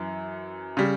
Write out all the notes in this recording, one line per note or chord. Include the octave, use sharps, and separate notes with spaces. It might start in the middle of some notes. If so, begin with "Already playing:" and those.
Already playing: F#2 E3
C#3 G3